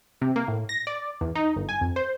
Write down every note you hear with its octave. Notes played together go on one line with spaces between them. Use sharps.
C3
A#3
A2
A#6
D5
E2
D#4
G1
G#5
F2
C5